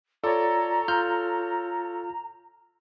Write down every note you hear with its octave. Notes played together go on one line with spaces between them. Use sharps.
F4 A4 C#5 D5 A#5
F4 F6 G6